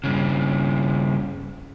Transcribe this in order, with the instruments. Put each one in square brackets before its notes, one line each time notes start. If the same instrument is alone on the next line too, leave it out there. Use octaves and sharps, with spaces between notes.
[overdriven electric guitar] G2 C#3